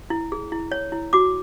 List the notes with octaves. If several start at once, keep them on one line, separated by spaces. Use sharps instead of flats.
E4
G#4
E4
C#5
E4
F#4 D6